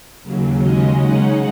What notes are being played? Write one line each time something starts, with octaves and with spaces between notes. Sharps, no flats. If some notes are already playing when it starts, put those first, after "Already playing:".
D#2 C#3 F#3
C#3 G#3 C#4 D#5
C#3 G#3 D#4 F#5